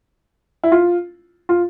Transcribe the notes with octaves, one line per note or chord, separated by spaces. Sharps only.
E4
F4
F4